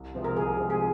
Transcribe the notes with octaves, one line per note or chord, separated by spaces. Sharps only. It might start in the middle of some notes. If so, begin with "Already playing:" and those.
Already playing: C2
C3 F3 G#3
A#4
C2 G#4
C3 F3 G#3
G#4